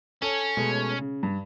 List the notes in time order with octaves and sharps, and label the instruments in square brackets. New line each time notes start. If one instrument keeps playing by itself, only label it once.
[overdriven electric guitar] C#4 [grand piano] A4 C#5 G7
[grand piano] B2 G#3 A3
C#3
G2